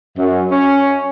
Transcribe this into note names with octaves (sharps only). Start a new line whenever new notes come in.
F#2
C#4